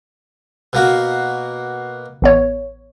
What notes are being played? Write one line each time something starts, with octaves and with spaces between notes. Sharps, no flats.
B2 A#3 F#4
A1 B3 C#5